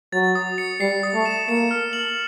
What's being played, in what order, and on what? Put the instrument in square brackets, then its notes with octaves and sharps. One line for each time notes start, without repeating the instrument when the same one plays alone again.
[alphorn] F#3 [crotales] A6
[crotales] D#6
C#7
[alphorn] G3 [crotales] C7
[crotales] D#6
[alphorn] A3
[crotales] E7
[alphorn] A#3 [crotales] C#7
[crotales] F6
F#7